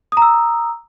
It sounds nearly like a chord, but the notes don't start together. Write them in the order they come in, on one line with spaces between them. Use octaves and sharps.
D#6 A#5 E6